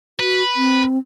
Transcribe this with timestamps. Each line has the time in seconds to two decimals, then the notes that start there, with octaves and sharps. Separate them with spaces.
0.20 F#4 B4
0.56 C4